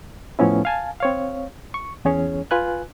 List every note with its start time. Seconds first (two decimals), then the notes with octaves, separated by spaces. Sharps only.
0.39 A2 F3 B3 C#4 E4
0.65 F5 G#5 A5
1.00 C4 C#5 F5
1.74 C#6
2.05 E2 C#4 G#4 C#5
2.51 F4 B4 G#5 F#6